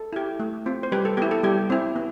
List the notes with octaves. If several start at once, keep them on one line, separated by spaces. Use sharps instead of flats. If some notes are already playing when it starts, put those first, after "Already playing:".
Already playing: A4
E4 G4
A3
C4 F4
C5
G3 G4 B4
A4
B3 E4 G4
A4
G3 G4
C4 E4
B3